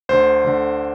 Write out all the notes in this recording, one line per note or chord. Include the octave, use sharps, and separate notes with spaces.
D2 D3 C5
D2 D3